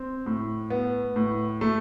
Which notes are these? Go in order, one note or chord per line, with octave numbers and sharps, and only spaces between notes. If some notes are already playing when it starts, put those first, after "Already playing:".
Already playing: C4
A2
B3
A2
A3